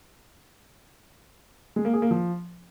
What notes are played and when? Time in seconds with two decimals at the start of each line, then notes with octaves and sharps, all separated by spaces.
1.76 G#3
1.85 A#3
1.93 G#4
2.02 A#3
2.11 F3